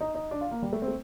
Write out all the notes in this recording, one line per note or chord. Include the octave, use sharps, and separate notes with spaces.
D#4
D#4
D4
F4
A#3
G3
A3
C4
A3